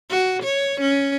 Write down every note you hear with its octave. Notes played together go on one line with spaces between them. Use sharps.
F#4
C#5
C#4